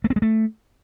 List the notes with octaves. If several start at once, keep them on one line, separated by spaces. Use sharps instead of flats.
A3
C4
G#3
A3